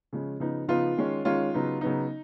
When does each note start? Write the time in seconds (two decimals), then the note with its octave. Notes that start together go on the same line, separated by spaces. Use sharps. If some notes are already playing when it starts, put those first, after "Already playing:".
0.13 C#3 F3 G#3 C#4
0.40 C#3 F3 B3 D#4
0.68 C#3 F3 B3 D#4 F4
0.97 D#3 G#3 C#4
1.25 D#3 G#3 C#4 F4
1.54 C#3 F#3 B3 D#4
1.81 C#3 F#3 B3 D#4